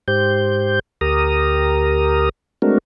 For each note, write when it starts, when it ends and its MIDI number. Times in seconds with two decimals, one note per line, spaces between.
0.08 0.79 44
0.08 0.79 67
0.08 0.79 72
0.08 0.79 91
1.01 2.29 38
1.01 2.29 67
1.01 2.29 70
1.01 2.29 82
1.01 2.29 87
2.62 2.78 56
2.62 2.78 57
2.62 2.78 60
2.62 2.78 62
2.62 2.78 66
2.62 2.78 70